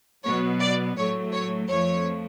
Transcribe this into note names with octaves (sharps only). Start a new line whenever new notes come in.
B2 F#3 B3 C#5
D5
A2 F#3 A3 C#5
C#5
F2 F3 A3 C#5